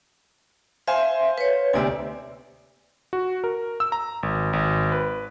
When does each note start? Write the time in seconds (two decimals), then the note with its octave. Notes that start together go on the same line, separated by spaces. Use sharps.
0.87 C5 E5 F5 G#5 C6
1.38 B4 C#5
1.73 D2 C3 C4 D5 G#5
3.13 F#4
3.44 A#4
3.80 E6
3.92 A#5
4.23 G#1
4.53 G#1
4.92 B4